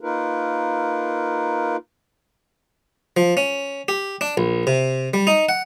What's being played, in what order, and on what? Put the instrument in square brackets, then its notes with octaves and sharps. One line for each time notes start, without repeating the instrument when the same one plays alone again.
[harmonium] A#3 D#4 F4 A#4 B4
[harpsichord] F3
C#4
G4
D4
A#1
C3
G3
D#4
F#5